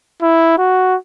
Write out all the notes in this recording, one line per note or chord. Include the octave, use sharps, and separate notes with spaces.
E4
F#4